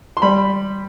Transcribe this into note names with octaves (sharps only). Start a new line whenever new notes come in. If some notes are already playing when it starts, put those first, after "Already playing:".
C6
G3 B5